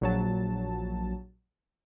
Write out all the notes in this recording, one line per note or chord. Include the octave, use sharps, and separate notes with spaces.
A#1 F#3 A5